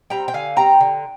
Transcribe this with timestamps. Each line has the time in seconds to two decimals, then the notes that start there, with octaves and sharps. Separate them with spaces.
0.10 G3 C4 G5 A#5
0.28 G5
0.34 D3 F5 G#5
0.56 G3 C4 G5 A#5
0.80 D3